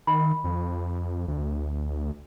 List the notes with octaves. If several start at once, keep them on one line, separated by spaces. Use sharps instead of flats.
D#3 B5
F2
D2